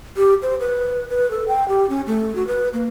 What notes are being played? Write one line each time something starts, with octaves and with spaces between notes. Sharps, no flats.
G4
C5
B4
B4
A4
G5
G4
C#4
A3
F#4
B4
A#3